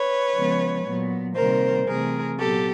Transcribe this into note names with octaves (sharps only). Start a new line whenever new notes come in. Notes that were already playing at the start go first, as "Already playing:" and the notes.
Already playing: B4 C#5
C#3 F3 G#3 B3
A#2 F#3 B3
C3 D#3 G3 A#3 A#4 C5
C3 E3 A3 G#4 A#4
A#2 F#3 B3 G4 A4